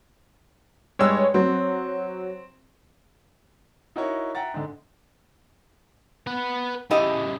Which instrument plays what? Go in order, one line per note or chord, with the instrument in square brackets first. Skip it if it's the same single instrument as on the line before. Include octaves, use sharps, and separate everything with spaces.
[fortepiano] G2 G#3 E6 [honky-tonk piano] C#5
[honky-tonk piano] F#3 [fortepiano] C4
[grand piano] D#4 E4 F#4 A#4 C#5
E5 F#5 G5 A#5 A6
G#2 D3
[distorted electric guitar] B4 F#5
[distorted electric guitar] C#3 G3 [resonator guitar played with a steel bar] E4 G4 D#5